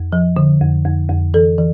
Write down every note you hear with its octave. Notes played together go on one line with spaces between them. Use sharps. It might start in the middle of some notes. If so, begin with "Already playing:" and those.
Already playing: F2
F3
D3
F2
F2
F2
E3 A4
E3